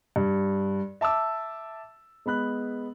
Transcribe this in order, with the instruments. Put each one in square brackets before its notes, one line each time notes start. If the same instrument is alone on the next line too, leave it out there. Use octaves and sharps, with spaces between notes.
[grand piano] G2
E5 A5 D6 E6
G#3 B3 B5 F#6